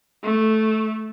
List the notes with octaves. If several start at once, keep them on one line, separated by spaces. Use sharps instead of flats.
A3